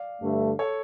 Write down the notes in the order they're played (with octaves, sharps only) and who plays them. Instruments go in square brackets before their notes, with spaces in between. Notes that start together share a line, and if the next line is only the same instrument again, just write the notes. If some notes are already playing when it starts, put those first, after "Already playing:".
Already playing: [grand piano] D5 F5
[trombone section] G2 D3 A3
[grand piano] A4 C#5